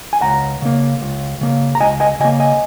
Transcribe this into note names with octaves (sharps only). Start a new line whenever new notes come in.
G#5
C#2 F#5 A#5
C#3 A#3
C#2
C#3 A#3
A#5
C#2 D#5 G#5
D#5 G#5
C#3 D#5 G#5
A#3
D#5 G#5